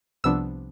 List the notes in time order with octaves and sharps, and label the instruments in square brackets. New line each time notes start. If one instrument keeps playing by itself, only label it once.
[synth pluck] C2 C3 F3 B3 D4 E6